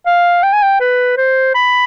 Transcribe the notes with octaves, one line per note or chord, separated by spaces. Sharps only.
F5
G5
G#5
G5
B4
C5
B5